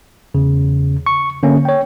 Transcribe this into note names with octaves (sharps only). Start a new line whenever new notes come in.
E2 C#3
C#6
D3 A#3 C#4
C#5 G5